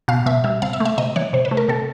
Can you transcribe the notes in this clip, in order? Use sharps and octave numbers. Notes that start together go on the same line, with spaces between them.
B2 F5
B2 E5
G3 E5
C3 F5
E5
A3
E5
C3 D#5
E3 C#5
C3 C5
B4
A3
A#4
C3 A4